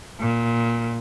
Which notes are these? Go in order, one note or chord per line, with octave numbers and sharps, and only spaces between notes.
A#2